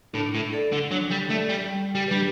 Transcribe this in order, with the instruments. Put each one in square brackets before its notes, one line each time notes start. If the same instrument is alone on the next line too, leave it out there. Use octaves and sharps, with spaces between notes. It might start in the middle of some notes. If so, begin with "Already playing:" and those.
[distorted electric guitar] A2 [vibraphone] D4
[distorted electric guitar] A2
[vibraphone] A4 D5
[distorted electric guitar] D3
[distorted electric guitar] F#3 [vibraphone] D4
[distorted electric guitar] G3
[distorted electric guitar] A3 [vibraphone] A4 D5
[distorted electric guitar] G3
[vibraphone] G3
[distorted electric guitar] G3
[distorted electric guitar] G3 [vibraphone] D4 G4 B4